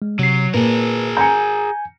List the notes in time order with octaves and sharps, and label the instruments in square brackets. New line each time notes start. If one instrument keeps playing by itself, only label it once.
[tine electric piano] G#3
[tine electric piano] C3 C7 [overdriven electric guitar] F#3
[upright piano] A#2 [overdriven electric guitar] G#4 A#4 [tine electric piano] B4
[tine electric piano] G#5 G6 [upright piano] A#5 C#7